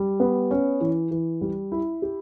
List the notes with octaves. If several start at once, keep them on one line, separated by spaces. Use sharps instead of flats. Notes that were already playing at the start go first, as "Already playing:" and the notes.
Already playing: G3
B3
C#4
E3
E3
G3
E4
G4